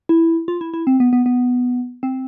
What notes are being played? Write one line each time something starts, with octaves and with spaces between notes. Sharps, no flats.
E4
F4
E4
E4
C4
B3
B3
B3
C4